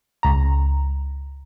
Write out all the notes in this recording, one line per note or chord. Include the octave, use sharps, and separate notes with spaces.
C#2 A#5